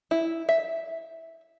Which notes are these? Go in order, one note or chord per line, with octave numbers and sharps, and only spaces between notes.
E4
E5